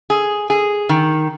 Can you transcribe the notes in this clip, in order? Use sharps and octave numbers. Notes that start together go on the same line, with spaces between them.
G#4
G#4
D#3